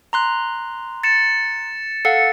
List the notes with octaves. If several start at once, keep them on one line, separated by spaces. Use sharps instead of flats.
A#5 C6 F#6
A6 C#7 E7
A4 F5 F#5 C#7